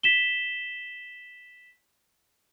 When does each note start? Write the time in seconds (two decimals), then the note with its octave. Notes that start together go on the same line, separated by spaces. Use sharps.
0.03 B6 E7 G7